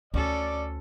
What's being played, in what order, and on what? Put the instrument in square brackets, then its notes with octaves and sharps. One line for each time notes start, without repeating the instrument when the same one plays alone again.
[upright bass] D2 [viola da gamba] C#4 A4 [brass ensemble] D5